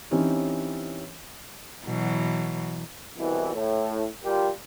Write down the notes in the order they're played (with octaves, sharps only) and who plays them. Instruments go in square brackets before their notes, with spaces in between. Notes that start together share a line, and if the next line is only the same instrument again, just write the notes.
[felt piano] E3 C4 C#4 D#4 G4 C#5
[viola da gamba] B2 E3 F#3
[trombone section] C2 B2 E3
A2
G3 F4 G4 A#4